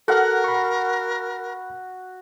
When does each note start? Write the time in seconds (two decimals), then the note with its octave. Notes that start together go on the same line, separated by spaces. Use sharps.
0.08 F#4 A4 A#4 F5 F#5
0.44 B5 C#6